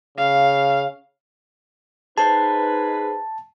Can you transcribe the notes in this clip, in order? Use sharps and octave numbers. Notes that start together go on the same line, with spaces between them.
C#3 F5
D#4 G#4 B4 C5 A5